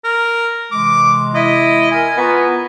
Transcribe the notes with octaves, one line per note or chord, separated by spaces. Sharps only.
A#4
C3 E3 G#3 D6
E4 D#5
A#4 G#5
B3 F4 A#5 C#6